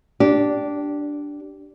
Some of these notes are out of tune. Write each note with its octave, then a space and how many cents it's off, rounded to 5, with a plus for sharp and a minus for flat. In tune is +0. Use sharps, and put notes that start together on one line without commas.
D4 -5 G4 -15